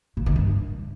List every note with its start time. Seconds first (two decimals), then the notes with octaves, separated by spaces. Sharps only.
0.17 A#2
0.26 D#3
0.36 G2